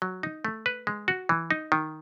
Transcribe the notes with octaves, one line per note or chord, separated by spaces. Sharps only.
F#3
D#4
A3
B4
G#3
F#4
E3
D#4
D#3